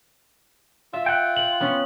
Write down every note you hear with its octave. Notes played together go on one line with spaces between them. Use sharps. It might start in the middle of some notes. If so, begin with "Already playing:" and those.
F4 E5
F#5 G5
F#7
B3 C#4